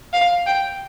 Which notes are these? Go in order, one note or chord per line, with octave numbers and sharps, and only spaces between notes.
F5
G5